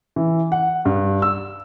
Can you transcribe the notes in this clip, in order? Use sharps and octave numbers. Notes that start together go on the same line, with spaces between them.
E3
F#5
G2
E6